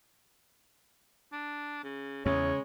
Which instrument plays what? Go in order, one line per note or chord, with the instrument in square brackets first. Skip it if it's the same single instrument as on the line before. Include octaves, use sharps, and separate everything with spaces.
[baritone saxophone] D4
C#3
[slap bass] E2 [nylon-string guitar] C#3 [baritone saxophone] G#3 [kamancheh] C#5